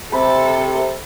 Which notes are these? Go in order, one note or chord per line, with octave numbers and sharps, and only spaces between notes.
C3 A4 B5